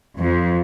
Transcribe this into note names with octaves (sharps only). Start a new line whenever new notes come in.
F2